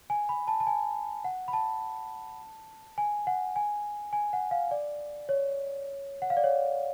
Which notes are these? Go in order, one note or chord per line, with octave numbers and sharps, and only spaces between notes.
G#5
B5
A5
A5
G#5
F#5
B5
A5
G#5
F#5
G#5
G#5
F#5
F5
D5
C#5
F#5
F5
D5
C#5